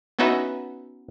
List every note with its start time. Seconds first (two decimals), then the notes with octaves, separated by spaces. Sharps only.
0.19 B3 C#4 D#4 F#4 B4 E5